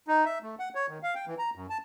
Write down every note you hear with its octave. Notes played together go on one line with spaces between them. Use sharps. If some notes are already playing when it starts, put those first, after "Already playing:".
D#4
E5
A3
F#5
C#5
D#3
F5
G5
E3
A#5
F#2
A5